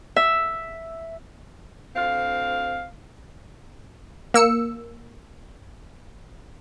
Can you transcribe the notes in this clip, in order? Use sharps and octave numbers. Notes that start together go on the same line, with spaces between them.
E5
D2 C4 F5
A#3 E6 C#7